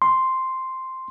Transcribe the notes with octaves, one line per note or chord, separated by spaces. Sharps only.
C6